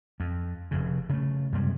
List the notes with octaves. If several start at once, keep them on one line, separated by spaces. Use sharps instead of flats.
F2
F1 F2 C#3
C#3 A3
F#2 C3 G3 G#3